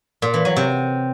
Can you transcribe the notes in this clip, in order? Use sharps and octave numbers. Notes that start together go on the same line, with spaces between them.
A#2
E3
F#3
C3